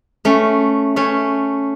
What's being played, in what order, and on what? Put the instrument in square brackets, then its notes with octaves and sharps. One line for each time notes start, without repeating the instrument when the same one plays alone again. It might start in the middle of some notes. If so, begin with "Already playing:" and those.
[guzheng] A3 C#4
A3 C#4